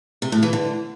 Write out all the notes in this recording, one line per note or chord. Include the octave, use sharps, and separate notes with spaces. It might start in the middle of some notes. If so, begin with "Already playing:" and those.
C3
A2
E3
D3